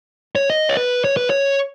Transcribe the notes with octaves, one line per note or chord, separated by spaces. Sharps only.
C#5
D#5
C#5
B4
C#5
B4
C#5